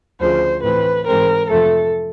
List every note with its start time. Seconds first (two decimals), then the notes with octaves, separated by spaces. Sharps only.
0.20 D2 C#3 F3 C5
0.63 A2 E3 A3 C4 B4
1.06 G#2 E3 G#3 C4 A#4
1.49 F2 C3 F3 A3 A4